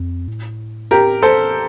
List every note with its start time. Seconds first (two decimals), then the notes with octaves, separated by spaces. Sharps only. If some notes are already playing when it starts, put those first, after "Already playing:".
Already playing: F2
0.28 A2
0.91 G4 A#4
1.22 A4 C5